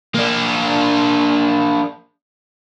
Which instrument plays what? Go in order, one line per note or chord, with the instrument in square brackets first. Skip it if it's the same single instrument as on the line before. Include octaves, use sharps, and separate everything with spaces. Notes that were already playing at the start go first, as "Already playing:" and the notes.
[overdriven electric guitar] A#3 D4